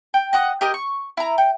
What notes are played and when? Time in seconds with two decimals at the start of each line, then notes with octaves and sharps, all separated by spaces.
0.14 G5
0.33 D#5 F#5 D#6
0.61 G4 A#4 D#5 G5
0.74 C#6
1.17 E4 A#5
1.38 G5